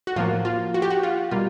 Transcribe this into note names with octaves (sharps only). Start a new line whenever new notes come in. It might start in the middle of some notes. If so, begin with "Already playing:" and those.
F#4
A2 F3 A#3 F4
F4
F#4
G4
F#4
F4
B2 G3 A#3 F4